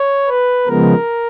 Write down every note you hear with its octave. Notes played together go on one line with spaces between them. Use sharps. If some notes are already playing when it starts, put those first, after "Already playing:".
Already playing: C#5
B4
C#3 F3 G#3 B3 A#4